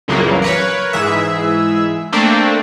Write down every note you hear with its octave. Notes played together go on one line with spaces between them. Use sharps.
C2 F#2 A#2 C#3 E3 A#3
A#4 B4 C#5
G#2 E3 G#4 E5
A3 A#3 C4 D4